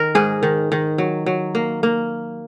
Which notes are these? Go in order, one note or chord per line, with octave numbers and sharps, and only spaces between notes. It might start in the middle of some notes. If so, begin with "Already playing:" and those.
Already playing: D#3 A#4
G#2 G#4
D#3
D#3
F#3
F#3
A#3
A#3